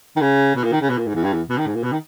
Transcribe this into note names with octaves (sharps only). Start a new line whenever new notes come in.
D#3
C#3
B2
A#2
D#3
C#3
B2
A#2
G#2
E2
G2
E2
B2
D#3
G#2
A#2
B2
D#3